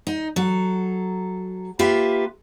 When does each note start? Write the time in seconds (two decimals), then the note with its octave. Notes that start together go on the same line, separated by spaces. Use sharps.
0.07 D#4
0.36 F#3 A4
1.79 A#3 F4 G4 B4 E5